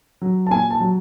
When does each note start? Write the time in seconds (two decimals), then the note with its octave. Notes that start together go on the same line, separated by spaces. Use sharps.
0.22 F#3
0.47 A5
0.51 A#2 G#5
0.70 A5
0.80 F#3